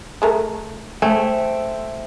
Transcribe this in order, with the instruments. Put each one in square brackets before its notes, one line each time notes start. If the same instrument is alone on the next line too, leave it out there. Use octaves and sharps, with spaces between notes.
[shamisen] G#3 A3 A#4
[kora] A3 [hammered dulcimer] C5 E5 G5 [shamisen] G#5